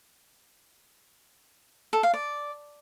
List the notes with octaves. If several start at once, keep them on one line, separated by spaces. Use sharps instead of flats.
A4
F5
D5